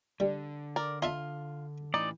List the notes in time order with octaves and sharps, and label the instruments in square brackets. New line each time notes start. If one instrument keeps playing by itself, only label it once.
[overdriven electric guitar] D3 [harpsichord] G3
[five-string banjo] A#4 D5
[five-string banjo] F4 [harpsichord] D#5 E5 A5
[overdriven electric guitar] A2 E3 [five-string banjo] D#4 [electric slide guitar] D5